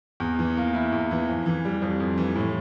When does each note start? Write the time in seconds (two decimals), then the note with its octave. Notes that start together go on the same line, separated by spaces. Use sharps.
0.20 E2
0.39 E3
0.57 A#3
0.74 E4
0.92 E2
1.11 E3
1.28 F2
1.46 E3
1.65 G3
1.82 F2
2.00 F2
2.18 E3
2.36 A2